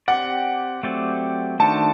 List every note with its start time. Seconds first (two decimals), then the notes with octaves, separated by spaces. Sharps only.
0.08 C4 G4 D5 F#5
0.83 F#3 A3 C4 G4 D5
1.59 D#3 A3 D4 F#4 C5 A5